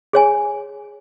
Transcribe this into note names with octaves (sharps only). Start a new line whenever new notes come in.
G#4 C#5 G#5